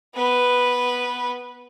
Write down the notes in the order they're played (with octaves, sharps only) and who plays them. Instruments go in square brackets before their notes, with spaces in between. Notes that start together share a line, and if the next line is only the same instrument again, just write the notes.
[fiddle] B3 B4